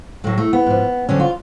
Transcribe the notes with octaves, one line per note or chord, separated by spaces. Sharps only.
A2 F#3 A3
A3
B3
G#2 F3
F2 D3 F#3 C#4
F4